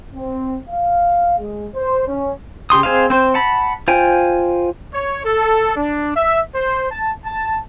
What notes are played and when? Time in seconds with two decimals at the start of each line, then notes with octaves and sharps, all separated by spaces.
0.16 C4
0.69 F5
1.38 G#3
1.76 C5
2.08 C#4
2.70 C#3 G4 C6 D#6
2.83 C4 G#4 C5 D#5 F5
3.10 C4 C5
3.34 F#5 A5 B5
3.88 F4 C5 G5 G#5
4.93 C#5
5.23 A4
5.76 D4
6.15 E5
6.54 C5
6.91 A5
7.24 A5